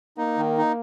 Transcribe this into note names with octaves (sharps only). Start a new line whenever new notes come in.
A#3 D#4
D#3
D#4